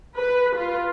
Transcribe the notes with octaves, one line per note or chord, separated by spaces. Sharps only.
B4
F4